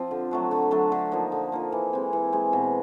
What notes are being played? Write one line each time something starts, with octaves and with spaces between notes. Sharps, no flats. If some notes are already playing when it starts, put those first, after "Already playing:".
Already playing: F3 C4 F4
D3
F#3 A3 D4
D3
F#3 A3 D4
D3
F3 A#3 D#4
D3
F3 A#3 D#4
E3
G#3 C4
E3
G#3 C4
B2